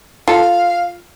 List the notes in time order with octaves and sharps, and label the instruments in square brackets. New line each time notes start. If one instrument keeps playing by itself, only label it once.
[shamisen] F4 A4 [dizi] F5